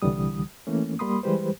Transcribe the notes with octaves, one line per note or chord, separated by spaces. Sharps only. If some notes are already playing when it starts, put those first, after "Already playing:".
C2 D3 E3 G3 D#6
E3 A3 A#3 C#4
G3 A#3 B5 C6 D#6
E3 G3 G#3 G4 B4 C5